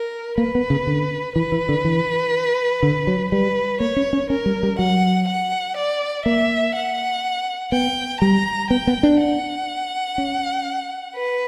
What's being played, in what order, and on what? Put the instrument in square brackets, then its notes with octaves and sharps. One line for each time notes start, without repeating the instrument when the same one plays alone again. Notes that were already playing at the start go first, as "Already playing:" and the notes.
Already playing: [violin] A#4
[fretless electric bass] A#3 [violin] B4
[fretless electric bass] B3
C#3
D3
[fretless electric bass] E3 [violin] B4
[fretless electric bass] E3
D3
E3
D3
F#3
[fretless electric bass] G3 [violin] B4
[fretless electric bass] A#3 [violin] C#5
[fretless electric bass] C#4
C#4
[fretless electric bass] C#4 [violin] A#4
[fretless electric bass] G3
G3
[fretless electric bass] F#3 [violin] F#5
[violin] F#5
D5
[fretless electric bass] A#3 [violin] E5
[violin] F#5
[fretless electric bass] B3 [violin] G5
[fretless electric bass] G3 [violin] A#5
[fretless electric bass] B3 [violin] G5
[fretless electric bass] B3
D4
[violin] F#5
[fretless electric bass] C#4
[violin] B4